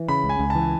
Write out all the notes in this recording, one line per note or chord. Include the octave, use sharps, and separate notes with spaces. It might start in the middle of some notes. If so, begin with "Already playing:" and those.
Already playing: E3
C#3 B5
C#2
G#5
C#2
A5
E3